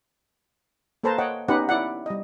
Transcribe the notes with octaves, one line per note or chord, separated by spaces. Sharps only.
A#3 A4 B4 C5 A5 A#5
C#5 D#5 F#5 G5
B3 C#4 D#4 G4 B4 F#5
E4 D5 F#5
G3 D#5